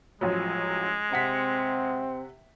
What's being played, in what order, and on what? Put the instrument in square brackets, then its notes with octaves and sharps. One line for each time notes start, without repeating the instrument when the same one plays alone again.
[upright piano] A1 F3 F#3 [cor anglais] G#3
[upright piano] C3 F#5 B6 [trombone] C4